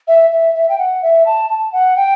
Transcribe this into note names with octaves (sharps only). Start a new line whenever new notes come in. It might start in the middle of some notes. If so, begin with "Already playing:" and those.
E5
E5
E5
G5
F#5
E5
A5
A5
F#5
G5